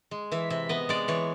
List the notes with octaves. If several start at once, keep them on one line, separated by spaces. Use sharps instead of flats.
G#3
E3 E5
C3 E5
B3 D#5
G#3 D5
E3 C#5